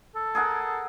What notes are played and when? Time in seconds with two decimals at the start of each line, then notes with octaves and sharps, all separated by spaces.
0.16 A4
0.35 G#4 A#4 F#5